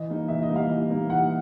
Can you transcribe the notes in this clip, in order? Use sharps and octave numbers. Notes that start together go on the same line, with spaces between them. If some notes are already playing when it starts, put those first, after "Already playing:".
Already playing: E3 D#5
G3 A#3 D#4
E3 E5
D#5
G3 A#3 D#4
F5
E3
G3 A#3 D#4
E3 F#5